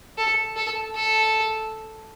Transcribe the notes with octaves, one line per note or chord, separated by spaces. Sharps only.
A4
A4
A4